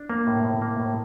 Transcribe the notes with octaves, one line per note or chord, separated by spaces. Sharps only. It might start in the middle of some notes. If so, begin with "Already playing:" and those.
Already playing: D4
A#3
A2
A2
A#3
A2